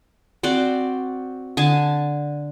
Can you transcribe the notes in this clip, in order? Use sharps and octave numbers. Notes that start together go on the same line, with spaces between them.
C4 F#4 C5 D5
D3 G#5 A5